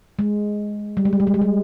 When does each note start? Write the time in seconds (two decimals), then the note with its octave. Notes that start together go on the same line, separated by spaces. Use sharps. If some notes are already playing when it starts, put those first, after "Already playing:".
0.19 G#3
0.97 G3
1.05 G#3
1.13 G3
1.20 G#3
1.27 G3
1.34 G#3
1.42 G3